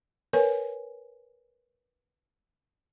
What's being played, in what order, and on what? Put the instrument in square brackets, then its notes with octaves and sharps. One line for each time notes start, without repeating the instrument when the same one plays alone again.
[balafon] A#4 B4 C#5 G#5